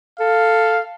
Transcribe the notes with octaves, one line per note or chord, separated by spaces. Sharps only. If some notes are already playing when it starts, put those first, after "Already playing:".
A4 F5